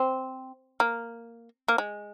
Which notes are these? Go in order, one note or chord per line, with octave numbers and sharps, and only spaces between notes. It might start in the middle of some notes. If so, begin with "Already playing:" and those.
Already playing: C4
A#3
A#3
G#3